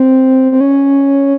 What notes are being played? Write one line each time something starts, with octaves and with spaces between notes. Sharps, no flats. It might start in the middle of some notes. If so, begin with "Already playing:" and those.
Already playing: C4
C4
C#4